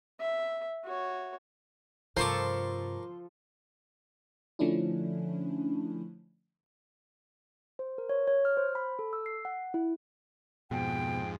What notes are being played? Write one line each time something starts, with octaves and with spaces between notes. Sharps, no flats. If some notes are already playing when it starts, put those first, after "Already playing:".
E5
F#4 C#5
G2 C3 F3 A4 A#4 C5 C#6 D6
D3 F3 A3 C#4 D4 E4
C5
A#4
C#5
C#5
F6
C5
B5
A4
E6
C7
F#5
E4
F2 G#2 B2 G5